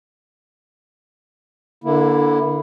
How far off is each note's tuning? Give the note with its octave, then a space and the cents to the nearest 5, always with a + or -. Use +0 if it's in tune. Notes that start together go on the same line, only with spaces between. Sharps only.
D3 +0 A#3 +30 E4 +0